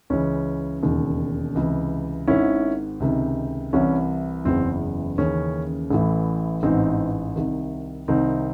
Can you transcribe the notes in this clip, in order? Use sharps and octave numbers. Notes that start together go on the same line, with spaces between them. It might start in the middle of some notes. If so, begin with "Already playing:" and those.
C#2 C#3 E3 C#4
E1 D#2 C#3
C#2 C3 E3
G#1 G#2 D#3 C#4 E4
C#2 C3 D#3
C2 C3 E3 C#4
F#1 E2 C#3 E3 C4
D#2 C#3 E3 C#4
A1 A2 E3
A1 G#2 E3 C4 D#4
C2 C3 D#3
C2 C3 D#3 C4 D#4